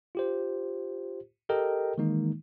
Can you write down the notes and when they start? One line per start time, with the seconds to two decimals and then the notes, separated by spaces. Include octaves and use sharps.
0.15 F4 G4 C5
1.49 G4 A4 A#4 D#5 G5
1.98 D#3 E3 G#3 A#3 D#4